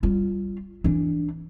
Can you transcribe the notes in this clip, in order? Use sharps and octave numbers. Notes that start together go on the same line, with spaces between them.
G3 F4
E3 D4